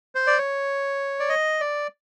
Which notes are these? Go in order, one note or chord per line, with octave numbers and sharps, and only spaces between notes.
C5
D5
C#5
D5
D#5
D5